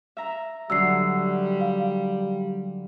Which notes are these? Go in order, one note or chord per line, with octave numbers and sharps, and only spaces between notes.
E5 A#5
D3 F#3 G3 E6 C7
F5